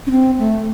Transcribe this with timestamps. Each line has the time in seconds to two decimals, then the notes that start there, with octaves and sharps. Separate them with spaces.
0.07 C#4
0.11 C4
0.39 A3